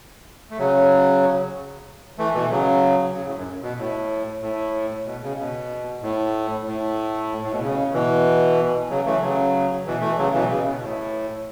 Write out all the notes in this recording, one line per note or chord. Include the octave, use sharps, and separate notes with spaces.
A3
C#3 F#3
E3 A3
B2 E3
C#3 F#3
C#3 F#3
A2
F#2
B2
A2
A2
B2
C#3
B2
A2
A2
A2
B2
C#3
B2 E3
C#3 F#3
E3 A3
C#3 F#3
B2 E3
E3 A3
C#3 F#3
B2 E3
C#3
B2
A2